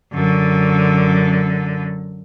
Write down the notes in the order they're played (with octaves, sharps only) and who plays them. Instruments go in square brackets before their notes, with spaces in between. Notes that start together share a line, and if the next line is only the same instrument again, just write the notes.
[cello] F#2 D3